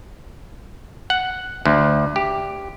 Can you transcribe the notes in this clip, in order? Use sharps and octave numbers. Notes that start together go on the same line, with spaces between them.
F#5
D2
G4